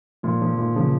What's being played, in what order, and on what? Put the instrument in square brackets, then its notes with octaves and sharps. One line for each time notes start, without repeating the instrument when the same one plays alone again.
[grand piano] A#2 [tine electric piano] F3
[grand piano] F3
[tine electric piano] D#3
[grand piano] A#2
[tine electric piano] C#3 [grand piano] F3